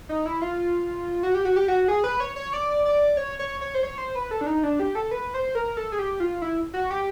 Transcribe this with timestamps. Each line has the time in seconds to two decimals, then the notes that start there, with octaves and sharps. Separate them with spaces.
0.09 D#4
0.26 E4
0.42 F4
1.23 F#4
1.35 G4
1.45 F#4
1.56 G4
1.68 F#4
1.88 G#4
2.04 B4
2.20 C#5
2.36 C#5
2.53 D5
2.85 D5
3.17 C#5
3.39 C#5
3.61 C#5
3.75 C5
3.83 C#5
3.98 C5
4.15 B4
4.31 A4
4.41 D4
4.47 D#4
4.63 D4
4.80 G4
4.95 A4
5.11 B4
5.34 C5
5.55 A#4
5.77 A4
5.92 G#4
5.99 G4
6.20 F4
6.42 E4
6.73 F#4
6.91 G4